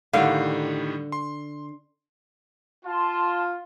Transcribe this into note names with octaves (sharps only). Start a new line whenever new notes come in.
A2 D3 D#3 G3 F5
C6
F4 A5 C6